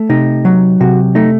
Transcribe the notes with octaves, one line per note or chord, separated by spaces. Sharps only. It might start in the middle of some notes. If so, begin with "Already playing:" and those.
Already playing: A3
C3 D#4
F#3
C3 F#4
A3 D#4